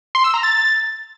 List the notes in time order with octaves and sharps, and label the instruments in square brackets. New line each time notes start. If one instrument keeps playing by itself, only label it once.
[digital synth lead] C6
E6
A#5
A6